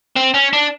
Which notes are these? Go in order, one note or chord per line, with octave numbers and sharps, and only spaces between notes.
C4
C#4
D4